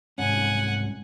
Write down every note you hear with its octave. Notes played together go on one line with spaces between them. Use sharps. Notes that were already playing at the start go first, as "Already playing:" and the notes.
C2 G#2 C#4 F#5 G#5